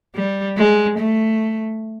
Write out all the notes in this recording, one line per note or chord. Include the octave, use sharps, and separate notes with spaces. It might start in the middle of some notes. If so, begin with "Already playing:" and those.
G3
G#3
A3